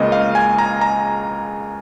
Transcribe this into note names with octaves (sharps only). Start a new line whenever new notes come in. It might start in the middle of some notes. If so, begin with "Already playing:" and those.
Already playing: C#2 C#3 A#3 D#5
F5
G#5
A#5
A#5